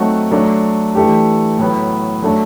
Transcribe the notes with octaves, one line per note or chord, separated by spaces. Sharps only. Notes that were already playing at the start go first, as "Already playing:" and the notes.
Already playing: F#3 A3 C4 D#4 F#4
F#3 A3 D4
E3 A3 D4 G4
A2 F#3 B3
F#3 A3 D4